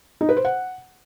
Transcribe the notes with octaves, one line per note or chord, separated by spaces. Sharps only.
D#4
B4
C5
F#5